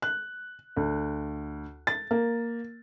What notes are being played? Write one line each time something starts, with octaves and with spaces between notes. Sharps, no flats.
F#6
D2
A6
A#3